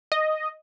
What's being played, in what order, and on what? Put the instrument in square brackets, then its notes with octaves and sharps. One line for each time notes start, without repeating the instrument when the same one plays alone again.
[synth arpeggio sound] D#5